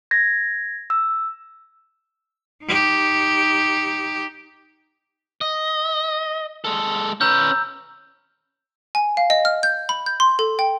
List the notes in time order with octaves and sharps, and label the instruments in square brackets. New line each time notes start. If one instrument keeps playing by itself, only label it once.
[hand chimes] G#6 A#6
E6
[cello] D#4 G4
[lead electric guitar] D#5
G#3 A4
[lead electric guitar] C#4 B4 [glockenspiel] A#5 E6 G6
[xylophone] G#5
F5
D#5
F6
G6
B5
G6
C6
A4
G5